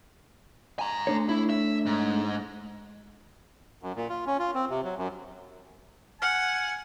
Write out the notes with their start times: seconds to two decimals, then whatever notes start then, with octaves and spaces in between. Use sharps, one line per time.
0.79 G#5 A#5
1.07 A3 D4 C#5
1.29 E4
1.50 E5
1.86 G#2
3.83 F#2
3.96 A#2
4.09 F4
4.26 C#4
4.39 F4
4.55 C4
4.70 C3
4.84 F#3
4.98 F#2
6.22 F#5 G#5 F6